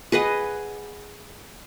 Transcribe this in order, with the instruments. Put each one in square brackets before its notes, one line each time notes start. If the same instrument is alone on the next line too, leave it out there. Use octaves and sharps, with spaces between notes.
[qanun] G#4 B4 D#5 F#5